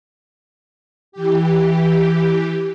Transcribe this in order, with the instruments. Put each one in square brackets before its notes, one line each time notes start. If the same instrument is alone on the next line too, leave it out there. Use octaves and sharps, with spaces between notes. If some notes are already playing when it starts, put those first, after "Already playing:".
[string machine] E3 G4